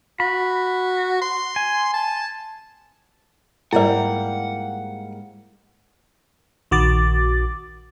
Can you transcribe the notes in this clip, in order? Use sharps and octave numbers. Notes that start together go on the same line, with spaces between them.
F#4 B5
C6
G#5
A5
G#2 G3 A#3 E4 D5 F#5
A#1 D#3 F#4 D6 A6